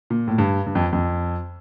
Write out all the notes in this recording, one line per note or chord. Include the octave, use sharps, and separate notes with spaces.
A#2
A2
G2
G2
F2
F2